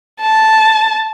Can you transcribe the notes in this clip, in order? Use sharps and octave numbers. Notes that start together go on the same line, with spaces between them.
A5